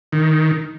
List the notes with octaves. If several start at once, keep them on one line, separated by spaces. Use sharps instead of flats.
D#3